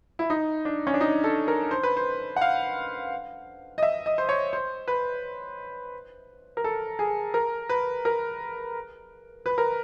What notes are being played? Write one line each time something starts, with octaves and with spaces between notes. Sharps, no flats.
E4
D#4
D4
C#4
D4
D#4
A4
A#4
C5
B4
C5
F#5
F5
D#5
E5
D#5
C5
C#5
C5
B4
A#4
A4
G#4
A#4
B4
A#4
B4
A#4